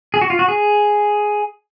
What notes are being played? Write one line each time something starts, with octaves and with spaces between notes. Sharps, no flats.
G#4
F#4
F4
F#4
G#4